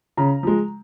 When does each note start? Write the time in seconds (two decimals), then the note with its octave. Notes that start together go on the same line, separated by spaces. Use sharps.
0.17 C#3 A#5
0.43 F3 G#3